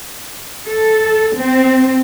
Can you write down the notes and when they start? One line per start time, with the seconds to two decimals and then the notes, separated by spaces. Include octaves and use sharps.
0.66 A4
1.37 C4